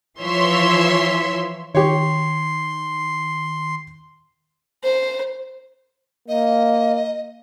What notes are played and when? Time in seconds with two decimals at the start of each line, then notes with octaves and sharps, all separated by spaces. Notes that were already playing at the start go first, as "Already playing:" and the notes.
0.20 E3 F3 C#5 E5 C6
1.75 D#3 G4 C#5 C6
4.84 C5
6.28 A#3 D#5